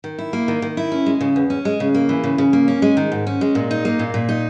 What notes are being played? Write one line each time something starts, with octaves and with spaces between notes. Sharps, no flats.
D#3
E4
A#3
D#3
D#3
E4
C#4
G#3
C#3
E2
C#4
G#3
C#3
A#3
E3
C#3
C#3
A#3
C#4
G#3
D#3
G#2
C#4
G#3
A#2
D#4
A#3
A#2
A#2
D#4